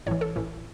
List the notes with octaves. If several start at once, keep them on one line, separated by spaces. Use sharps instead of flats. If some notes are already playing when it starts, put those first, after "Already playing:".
A1 A2 E3 C#5
A4
A1 A2 E3